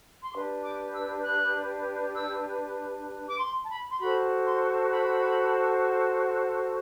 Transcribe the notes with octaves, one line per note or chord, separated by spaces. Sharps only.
C6
D4 G4 B4 D6
D6
E6
F#6
E6
D6
C6
A5
B5
C6
F#4 A4 C5 B5
C6
B5